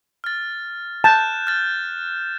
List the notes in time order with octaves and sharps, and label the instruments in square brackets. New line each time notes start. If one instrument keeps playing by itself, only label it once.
[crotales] F6 A6
[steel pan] A5 [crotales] F#6 G6 E7
[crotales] F6 A6